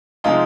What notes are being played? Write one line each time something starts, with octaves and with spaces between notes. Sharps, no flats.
C3 F3 G#3 D#4 F4